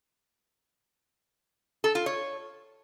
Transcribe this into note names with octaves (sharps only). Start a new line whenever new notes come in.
A4
F4
C#5